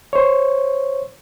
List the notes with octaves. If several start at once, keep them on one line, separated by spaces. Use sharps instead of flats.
C5 C#5